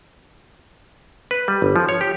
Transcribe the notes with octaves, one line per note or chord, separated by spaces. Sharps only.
B4
G3
G1
F3
C#5
G4